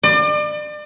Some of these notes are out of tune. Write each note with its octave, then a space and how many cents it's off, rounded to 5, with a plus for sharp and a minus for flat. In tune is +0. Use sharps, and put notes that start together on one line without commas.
D5 +35